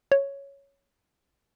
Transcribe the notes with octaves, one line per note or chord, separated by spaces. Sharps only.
C#5